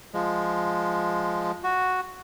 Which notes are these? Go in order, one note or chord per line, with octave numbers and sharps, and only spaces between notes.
F3 G#3
F#4